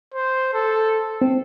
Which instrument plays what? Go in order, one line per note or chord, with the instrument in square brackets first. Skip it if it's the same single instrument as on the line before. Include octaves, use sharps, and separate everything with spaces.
[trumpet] C5
A4
[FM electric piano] C4